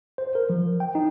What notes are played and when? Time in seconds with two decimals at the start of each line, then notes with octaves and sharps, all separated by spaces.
0.18 C5
0.35 A#4
0.50 F3
0.80 G5
0.95 D#4